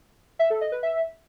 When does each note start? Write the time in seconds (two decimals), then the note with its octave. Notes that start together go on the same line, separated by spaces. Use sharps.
0.39 E5
0.50 A4
0.61 D#5
0.72 B4
0.83 E5